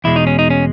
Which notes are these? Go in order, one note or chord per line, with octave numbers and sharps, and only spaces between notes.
E2 B2 G#3 E4
D#4
C#4
D#4
C#4